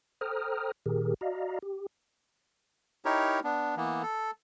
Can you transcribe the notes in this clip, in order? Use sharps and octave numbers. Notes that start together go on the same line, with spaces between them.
A4 C5 G5 A#5 D#6 F6
A#2 D#3 G4 G#4 A#4
F#4 D5 D#5 F5 A#5
G4
D#4 E4 G4 A#4 C#5
B3 D4
E3 A#3 B3
A4